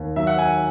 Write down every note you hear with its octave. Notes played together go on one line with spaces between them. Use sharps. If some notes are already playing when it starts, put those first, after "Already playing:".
Already playing: D#2
F#3 E5
F#5
G#5